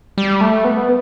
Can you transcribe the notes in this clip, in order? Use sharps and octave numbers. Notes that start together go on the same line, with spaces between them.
G3
A3
B3